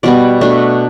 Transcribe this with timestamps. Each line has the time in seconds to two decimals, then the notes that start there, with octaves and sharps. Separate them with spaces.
0.03 B2 G3 B3 D5
0.41 B2 A3 D4